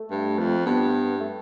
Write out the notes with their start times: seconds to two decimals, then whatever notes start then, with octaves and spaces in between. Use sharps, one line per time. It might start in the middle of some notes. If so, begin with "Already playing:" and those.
Already playing: A3
0.11 G2
0.39 F2
0.66 G2 B3
1.20 A3